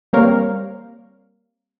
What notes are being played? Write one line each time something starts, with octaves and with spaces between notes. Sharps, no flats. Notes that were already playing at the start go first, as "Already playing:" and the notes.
G3 A#3 C4 A#4 C#5 F5